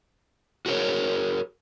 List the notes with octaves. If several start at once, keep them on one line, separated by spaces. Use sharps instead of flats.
F#4 G#4 A#4 C#5